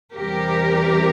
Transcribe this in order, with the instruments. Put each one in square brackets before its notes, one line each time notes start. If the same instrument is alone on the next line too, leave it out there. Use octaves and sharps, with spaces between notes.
[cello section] E2 C3 E3 G3 G4 A#4